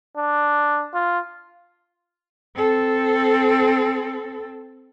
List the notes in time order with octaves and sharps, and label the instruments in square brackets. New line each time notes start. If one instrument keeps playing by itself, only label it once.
[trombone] D4
F4
[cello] C4 A4